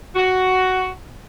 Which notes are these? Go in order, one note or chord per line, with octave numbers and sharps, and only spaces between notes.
F#4